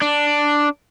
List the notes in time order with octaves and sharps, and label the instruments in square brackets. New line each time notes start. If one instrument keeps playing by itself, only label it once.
[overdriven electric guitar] D4